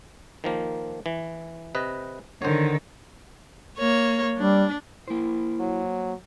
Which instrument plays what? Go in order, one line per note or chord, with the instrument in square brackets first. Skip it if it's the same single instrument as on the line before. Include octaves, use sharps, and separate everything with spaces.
[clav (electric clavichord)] D#3 F3 A#3
E3
C3 B4 D#5
[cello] D3 D#3 [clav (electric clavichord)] C5 C#5
[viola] A#3 C#5
[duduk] G3 [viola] D4
[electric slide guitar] A#3 C5 [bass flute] E4
[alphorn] F#3